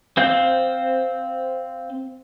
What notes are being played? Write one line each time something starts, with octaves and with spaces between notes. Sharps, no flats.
C4 C5 F5 G6